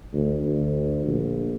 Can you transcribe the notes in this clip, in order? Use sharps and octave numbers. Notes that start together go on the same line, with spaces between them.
D2
D2
A#1